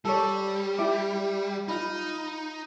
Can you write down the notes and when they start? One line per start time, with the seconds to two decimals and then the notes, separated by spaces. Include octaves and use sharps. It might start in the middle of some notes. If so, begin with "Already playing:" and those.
0.05 G3 A4 C#5
0.78 E4 G4
1.68 D#4 F4 B5